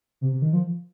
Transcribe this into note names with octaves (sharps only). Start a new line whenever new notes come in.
C3
C3
D#3
F3